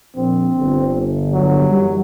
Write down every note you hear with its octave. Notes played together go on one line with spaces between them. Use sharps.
A#1 C4
G1
F#3
F#2 E3 G3